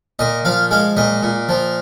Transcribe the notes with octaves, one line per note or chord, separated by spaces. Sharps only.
A#2 D#5
F3 F5
G#3 F5
A#2 D#5
A#2
F3